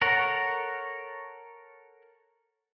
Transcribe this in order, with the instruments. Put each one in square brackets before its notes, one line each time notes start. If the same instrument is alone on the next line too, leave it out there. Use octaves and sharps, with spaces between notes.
[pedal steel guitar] A4 A#4 C#5 F#5